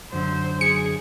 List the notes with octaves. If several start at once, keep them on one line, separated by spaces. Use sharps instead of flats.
F#2 D3 F#3 C5
G#4 C#7